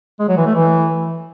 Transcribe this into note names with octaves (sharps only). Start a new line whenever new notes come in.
G#3
F#3
E3
A3
E3